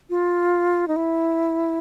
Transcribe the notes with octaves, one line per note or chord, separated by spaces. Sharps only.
F4
D#4
E4